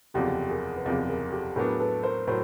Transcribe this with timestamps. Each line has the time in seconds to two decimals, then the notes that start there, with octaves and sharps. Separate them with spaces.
0.14 F#1 E2 C3 F3 G4 A4
0.49 G#4 A#4
0.76 B4
0.85 F#1 E2 C3 F3 G#4 A#4
1.09 G#4 A#4
1.32 G4 A4
1.56 A2 F#3 B3 D4 G#4 A#4
1.79 A4 B4
2.03 A#4 C5
2.27 A2 F#3 A#4 C5